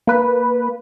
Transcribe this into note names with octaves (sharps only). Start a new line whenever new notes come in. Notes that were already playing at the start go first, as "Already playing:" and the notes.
A#3 B4